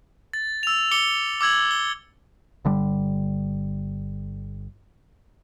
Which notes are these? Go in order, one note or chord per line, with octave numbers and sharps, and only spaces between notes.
A6
E6 F7
D6 C#7 G7
D6 E6 G#6 F#7
G7
G1 D3 G3